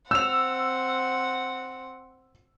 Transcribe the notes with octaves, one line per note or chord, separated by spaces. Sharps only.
C4 F#5 E6 F7